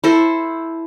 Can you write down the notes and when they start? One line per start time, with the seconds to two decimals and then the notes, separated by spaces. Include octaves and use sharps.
0.04 E4 A4 C5